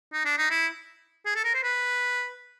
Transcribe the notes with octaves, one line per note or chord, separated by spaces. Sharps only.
D#4
D4
D#4
E4
G#4
A4
A#4
C5
B4